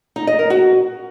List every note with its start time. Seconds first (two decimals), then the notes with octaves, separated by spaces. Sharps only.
0.16 D#4
0.27 D#5
0.39 A#4
0.50 F#4